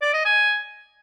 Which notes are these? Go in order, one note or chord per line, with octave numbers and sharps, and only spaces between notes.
D5
D#5
G#5